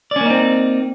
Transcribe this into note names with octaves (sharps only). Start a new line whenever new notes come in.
A#3 C4 C#4 D#4 D5